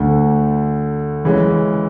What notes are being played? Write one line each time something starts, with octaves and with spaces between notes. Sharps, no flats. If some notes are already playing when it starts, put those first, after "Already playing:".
Already playing: D2 D3 A3
C#3 E3 G#3 C#4